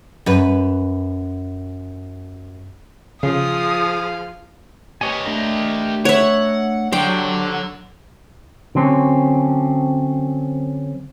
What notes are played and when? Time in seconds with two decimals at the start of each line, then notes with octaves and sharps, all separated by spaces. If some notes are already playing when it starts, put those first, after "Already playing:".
0.26 F#2 B4
3.23 C#3 F3 G#4 F5 D#6
5.01 G4 B4 C#5 D#5 G#5
5.26 A3 D4 A#4
6.05 C#5 E5 F#5
6.93 D3 F#3 D4 G4 C5 G5
8.75 D3 F#3 C4 C#4